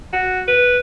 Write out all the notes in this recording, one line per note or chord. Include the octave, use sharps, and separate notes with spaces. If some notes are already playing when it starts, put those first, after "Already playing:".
F#4
B4